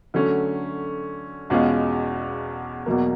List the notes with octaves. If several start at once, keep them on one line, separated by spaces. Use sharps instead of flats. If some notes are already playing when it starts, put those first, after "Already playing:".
D3 F#3 A3 C#4
E2 B2 G#3 C#4 F4
E2 B2 F#3 A#3